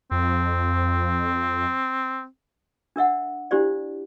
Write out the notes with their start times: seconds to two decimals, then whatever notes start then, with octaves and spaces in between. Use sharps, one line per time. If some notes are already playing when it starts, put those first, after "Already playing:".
0.11 F2 C4
2.96 D4 A#4 E5 F#5
3.51 D4 E4 G4 C5 D5